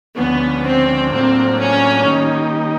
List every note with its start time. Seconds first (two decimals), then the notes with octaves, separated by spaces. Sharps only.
0.16 D2 D3 F3 G#3 B3 C#4
0.63 C4
1.11 A2 F#3 A#3 C4 D4 F4
1.58 C#4
2.05 D#3 G3 A#3 D#4